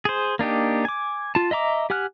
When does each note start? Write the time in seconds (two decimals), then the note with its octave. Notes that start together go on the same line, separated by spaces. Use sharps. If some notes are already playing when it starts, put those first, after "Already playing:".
0.05 G#4 C5
0.39 A#3 D4 D#4 G4
0.85 G#5 D6
1.35 F4 A5
1.51 D#5 E5 A#5 D6
1.90 G4 F#5 G#5 F6 F#6